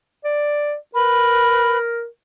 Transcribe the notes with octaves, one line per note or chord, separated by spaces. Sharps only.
D5
A#4 B4 B5